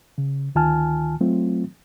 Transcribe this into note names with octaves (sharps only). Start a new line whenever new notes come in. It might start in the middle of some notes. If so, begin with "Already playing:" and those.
C#3
D2 D#3 F4 G#5 A5 F6
F#3 A3 C4 F4